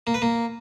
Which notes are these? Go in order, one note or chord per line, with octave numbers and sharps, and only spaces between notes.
A#3
B4
A#3